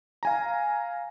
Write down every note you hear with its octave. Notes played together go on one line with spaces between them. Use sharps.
F5 G#5 A#5